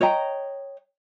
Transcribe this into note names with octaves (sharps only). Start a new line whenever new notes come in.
C#5 D#5 G5 A#5